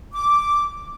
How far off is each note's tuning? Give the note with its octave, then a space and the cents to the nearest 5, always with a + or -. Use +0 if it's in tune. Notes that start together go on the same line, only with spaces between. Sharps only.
D6 -5